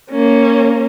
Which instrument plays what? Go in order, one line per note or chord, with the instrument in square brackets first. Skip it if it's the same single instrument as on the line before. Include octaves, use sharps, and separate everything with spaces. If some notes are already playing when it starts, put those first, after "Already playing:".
[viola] A#3 C#4